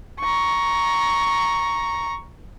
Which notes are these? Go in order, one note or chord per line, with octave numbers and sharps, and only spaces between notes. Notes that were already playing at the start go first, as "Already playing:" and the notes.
A#5 C#6